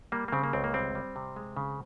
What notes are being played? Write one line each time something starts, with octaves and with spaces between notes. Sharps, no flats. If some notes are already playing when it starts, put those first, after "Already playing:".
G3 A#3
A#3
C#3 C4
A#3
C#2 C4
A#3
G3 C4
G3
C3
G#3
C#3